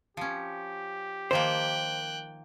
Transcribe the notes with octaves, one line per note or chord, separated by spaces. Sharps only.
F3 C#4 G4
D#3 F3 A#3 C5 G5 F#6